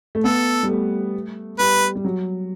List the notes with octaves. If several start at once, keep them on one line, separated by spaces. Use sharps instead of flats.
A3
B3 A4
G3
A3
G3 B4
G3
F#3